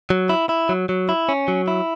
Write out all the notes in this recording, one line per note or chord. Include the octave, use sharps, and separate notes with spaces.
F#3
E4
E4
F#3
F#3
E4
C#4
F#3
E4